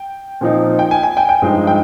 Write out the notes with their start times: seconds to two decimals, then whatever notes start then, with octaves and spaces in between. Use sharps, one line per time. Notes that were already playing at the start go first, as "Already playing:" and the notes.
Already playing: G5
0.41 A#2 F3 C4 D#4
0.79 G5
0.91 G#5
1.03 G#5
1.17 G5
1.29 G5
1.42 G2 F3 G#3 D#4
1.67 G5